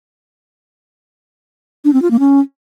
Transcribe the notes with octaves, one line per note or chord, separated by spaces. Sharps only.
D4
C4
F4
A#3
C#4